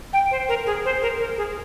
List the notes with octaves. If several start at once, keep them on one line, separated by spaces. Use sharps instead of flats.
G5
C5
A#4
G#4
C5
A#4
A#4
G#4